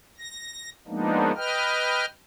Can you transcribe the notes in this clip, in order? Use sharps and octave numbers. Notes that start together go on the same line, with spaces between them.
A#6
F3 G#3 A#3 B3 D4 D#4
B4 D#5 G5 F6